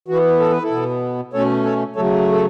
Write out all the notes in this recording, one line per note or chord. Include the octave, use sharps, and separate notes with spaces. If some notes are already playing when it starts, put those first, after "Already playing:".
E3 B3 F#4
A4
B4
E4 A4
B2 B3
B2 A3 C#4 A4 C#5
A4 C#5
C#3 F#3 A3 A4 C#5
A4